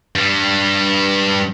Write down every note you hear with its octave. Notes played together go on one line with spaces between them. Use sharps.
G2 G3